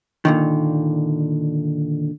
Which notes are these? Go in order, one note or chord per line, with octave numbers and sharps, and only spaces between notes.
A#2 D3 D#3